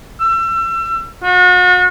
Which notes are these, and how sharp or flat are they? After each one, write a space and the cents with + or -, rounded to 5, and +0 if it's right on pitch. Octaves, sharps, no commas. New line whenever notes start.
E6 +35
F#4 -40